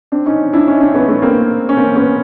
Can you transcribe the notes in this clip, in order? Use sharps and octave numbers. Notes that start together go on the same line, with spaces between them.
C4 D4
C#4 D#4
D4 E4
C#4 D#4
C4 D4
B3 C#4
A3 B3
A#3 C4
C#4
A#3 C4
B3 C#4